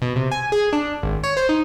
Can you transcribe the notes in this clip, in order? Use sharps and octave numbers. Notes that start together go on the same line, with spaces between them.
B2
C3
G#5
G#4
D4
G#1
C#5
C5
D#4